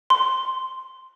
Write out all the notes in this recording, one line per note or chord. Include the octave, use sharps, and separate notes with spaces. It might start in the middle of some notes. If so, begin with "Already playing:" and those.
C6